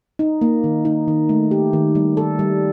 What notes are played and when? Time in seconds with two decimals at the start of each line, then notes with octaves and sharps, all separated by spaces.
0.19 D#4
0.42 A#3
0.64 D#3
0.85 D#4
1.08 D#3
1.29 A3
1.51 G4
1.73 D#3
1.95 G3
2.17 A4
2.39 G3